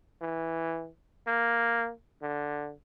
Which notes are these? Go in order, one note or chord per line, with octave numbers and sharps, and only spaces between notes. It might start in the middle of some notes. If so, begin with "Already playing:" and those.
E3
A#3
D3